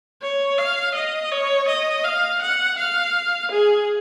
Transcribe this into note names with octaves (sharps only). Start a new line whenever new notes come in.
C#5
F5
D#5
C#5
D#5
F5
F#5
F5
G#4